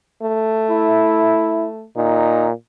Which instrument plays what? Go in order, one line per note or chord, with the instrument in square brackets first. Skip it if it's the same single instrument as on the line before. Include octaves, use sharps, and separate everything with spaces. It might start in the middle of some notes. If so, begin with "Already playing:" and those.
[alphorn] A3
[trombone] E4
[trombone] A#2 [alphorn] D#4